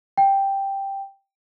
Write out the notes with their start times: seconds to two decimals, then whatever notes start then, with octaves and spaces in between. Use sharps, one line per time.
0.18 G5